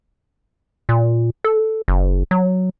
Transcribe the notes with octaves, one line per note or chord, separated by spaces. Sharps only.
A#2
A4
F#1
F#3